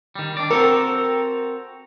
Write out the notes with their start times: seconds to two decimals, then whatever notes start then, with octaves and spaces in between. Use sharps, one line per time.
0.16 D#3 G3
0.37 D4 D5
0.51 C4 F#4 A4 A#4